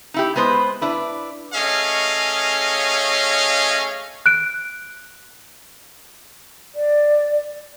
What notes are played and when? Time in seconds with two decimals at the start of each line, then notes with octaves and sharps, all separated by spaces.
0.14 D#4 E4 G4
0.36 G#3 B3 B4 C5
0.81 D4 E4 B4
1.53 A3 C#4 G#4 C#5 D#5 F5
4.26 F#6 D7
6.75 D5